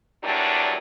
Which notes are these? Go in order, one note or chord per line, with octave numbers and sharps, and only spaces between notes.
E2 A#2 F#3 G3 D4